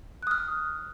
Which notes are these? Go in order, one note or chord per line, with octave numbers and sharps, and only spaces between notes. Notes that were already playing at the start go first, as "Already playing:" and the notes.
D#6 F6 F#6